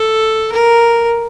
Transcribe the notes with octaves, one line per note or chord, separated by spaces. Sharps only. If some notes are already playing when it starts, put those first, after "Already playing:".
Already playing: A4
A#4